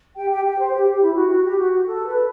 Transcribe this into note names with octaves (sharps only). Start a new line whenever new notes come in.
G4 G5
G4 G5
G4 G5
C5
G4
G4
E4
F#4
F#4
G4
F#4
F#4
A4
B4